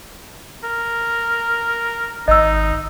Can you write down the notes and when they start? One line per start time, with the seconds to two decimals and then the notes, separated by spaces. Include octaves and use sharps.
0.64 A#4
2.28 G#1 D#4 D#5 E6